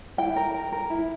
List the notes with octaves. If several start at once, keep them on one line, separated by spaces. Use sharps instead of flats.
E4 G5
A#4
A#4
A#4
E4